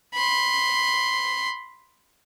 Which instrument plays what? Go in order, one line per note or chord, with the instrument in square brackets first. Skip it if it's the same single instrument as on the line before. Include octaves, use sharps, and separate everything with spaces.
[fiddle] B5 C6